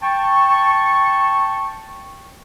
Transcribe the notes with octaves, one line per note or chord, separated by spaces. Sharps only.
G5 A5 C#6